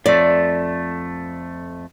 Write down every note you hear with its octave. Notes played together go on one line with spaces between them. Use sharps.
F2 A3 D5